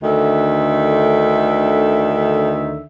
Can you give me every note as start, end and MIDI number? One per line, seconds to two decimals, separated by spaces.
0.03 2.82 38
0.03 2.82 50
0.03 2.82 51
0.03 2.82 76